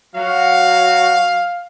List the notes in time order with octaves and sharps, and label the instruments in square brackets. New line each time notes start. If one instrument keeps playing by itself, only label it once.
[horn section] F#3 F#4 [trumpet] F5